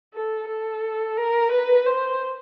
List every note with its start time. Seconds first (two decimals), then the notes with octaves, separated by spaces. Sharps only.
0.14 A4
0.48 A4
1.17 A#4
1.52 B4
1.86 C5